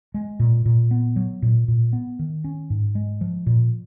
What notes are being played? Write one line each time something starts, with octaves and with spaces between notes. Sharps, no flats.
G#3
A#2
A#2
B3
F#3
A#2
A#2
B3
D#3
C#4
G#2
G#3
F3
A#2